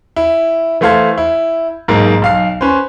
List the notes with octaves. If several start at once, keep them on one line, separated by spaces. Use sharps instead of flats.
E4
E3 A3 C5 F5 A5 G#6
E4
B1 G#2 A#3
B1 F5 C7
C#4 B4 C5